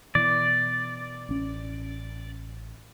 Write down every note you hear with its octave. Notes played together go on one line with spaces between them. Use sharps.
B2 E3 D5
A1 C#4